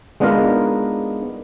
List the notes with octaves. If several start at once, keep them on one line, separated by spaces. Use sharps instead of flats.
G#3 B3 D4 D#4 F4 A#4